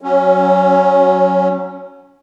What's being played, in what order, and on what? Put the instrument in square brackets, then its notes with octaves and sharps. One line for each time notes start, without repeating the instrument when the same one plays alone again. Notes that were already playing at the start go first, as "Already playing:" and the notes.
[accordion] F#3 C#4